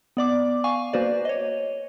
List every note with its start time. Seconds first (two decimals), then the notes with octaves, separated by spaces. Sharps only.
0.17 B3 D5 D6
0.64 F5 G#5 C#6
0.93 A#3 F#4 B4 C5 D5
1.25 C#5 D#5